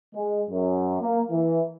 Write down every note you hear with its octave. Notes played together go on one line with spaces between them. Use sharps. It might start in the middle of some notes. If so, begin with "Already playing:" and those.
G#3
F#2
A#3
E3